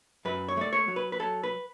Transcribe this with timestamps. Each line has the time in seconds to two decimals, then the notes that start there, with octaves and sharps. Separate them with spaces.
0.25 F#2 B4
0.49 C#5
0.57 A3 D5
0.73 C#5
0.88 F#3
0.96 B4
1.12 B4
1.20 F#3 A4
1.43 B4